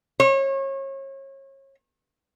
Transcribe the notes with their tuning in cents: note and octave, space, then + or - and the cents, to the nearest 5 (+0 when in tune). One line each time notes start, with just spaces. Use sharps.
C#5 -30